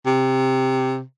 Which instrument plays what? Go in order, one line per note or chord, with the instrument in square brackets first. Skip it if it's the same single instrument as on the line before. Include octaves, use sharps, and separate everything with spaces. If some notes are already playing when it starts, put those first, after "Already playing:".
[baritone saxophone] C3